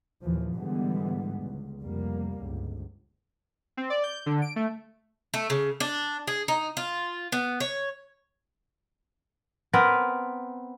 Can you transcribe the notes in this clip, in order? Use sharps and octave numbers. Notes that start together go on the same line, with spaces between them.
D#2 A#2 E3 F3
G#2 D3 E3 G3 G#3 B3
C#2
F1 C2 F2 G3 A#3
G1 C#2
C4
D5
G6
D3
D7
A3
A3
C#3
D4
G#4
D#4
F4
B3
C#5
B3 C4 A#4 B4